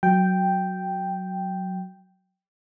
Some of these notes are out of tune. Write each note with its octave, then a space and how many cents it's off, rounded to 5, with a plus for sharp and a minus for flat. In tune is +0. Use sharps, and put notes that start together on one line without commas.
F#3 +0 G5 +0